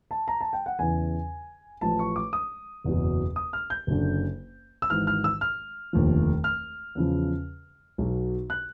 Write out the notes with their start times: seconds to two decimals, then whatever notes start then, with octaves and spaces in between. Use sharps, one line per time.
0.11 A5
0.28 A#5
0.41 A5
0.53 G5
0.66 F#5
0.79 E2 C#3 E3 G#5
1.81 A1 A2 F3 A5
1.99 C#6
2.16 D6
2.33 D#6
2.84 F#1 E2 B2 F#3
3.36 D#6
3.53 F6
3.70 G6
3.87 F#1 F#2 D3
4.82 E6
4.90 G#1 G#2 E3 F6
5.07 F6
5.24 E6
5.41 F6
5.93 F1 D#2 D3 F3
6.44 F6
6.95 E2 C#3 F3
7.98 B1 B2 F#3
8.50 F#6